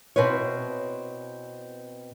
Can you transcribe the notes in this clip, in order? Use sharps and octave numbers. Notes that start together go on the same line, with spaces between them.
B2 C4 E4 B4 C#5